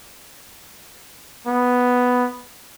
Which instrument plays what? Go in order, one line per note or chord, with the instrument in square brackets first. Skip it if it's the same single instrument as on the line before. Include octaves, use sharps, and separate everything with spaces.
[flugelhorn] B3